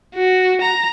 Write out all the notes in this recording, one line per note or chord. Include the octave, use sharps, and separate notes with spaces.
F#4
A#5